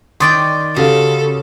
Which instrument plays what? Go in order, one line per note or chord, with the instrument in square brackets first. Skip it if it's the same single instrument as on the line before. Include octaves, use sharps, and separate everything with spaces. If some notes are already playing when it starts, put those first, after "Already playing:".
[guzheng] D#3 D5 G5 [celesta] C6 C#6 A6 [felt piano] D#6
[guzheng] C#3 [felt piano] F#4 G4 F5 [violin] A4